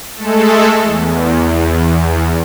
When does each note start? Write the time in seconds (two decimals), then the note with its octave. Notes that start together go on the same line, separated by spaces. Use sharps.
0.15 G#3 A3 A4
0.83 E2